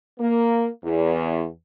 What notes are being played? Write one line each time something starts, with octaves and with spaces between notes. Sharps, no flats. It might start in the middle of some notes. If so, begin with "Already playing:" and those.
A#3
E2